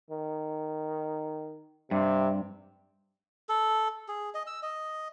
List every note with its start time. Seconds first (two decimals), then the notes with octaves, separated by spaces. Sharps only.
0.10 D#3
1.91 G2 C3
3.49 A4
4.08 G#4
4.34 D#5
4.47 E6
4.63 D#5